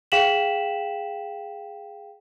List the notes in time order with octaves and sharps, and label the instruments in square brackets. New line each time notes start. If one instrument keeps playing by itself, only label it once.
[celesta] G#4 F5 G5 B6 E7 F#7